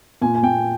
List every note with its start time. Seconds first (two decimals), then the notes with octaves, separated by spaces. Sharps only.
0.22 A#2 G#5
0.35 G#5
0.43 A#2 G5